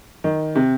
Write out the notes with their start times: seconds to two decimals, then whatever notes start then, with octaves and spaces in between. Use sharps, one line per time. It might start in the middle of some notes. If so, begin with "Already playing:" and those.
0.24 D#3
0.55 C3